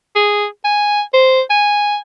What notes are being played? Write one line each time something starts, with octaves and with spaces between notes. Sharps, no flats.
G#4
G#5
C5
G#5